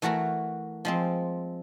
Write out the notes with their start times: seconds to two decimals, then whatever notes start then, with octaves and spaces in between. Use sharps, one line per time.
0.02 E3 A3 F#4 A#4 A#5
0.85 F3 G#3 C4